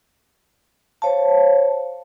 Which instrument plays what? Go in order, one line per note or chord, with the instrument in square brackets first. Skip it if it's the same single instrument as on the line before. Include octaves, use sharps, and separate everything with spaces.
[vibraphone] C5 C#5 F5 A5